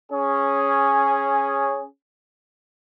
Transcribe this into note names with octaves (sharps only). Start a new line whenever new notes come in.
C#4 G#4